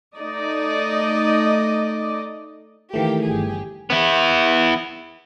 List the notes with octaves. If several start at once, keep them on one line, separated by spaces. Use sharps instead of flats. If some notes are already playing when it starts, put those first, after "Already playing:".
A3 D#4 D5 D#5
D#3 E3 A3 A#3 G4
G1 G4 G#4
B3 E4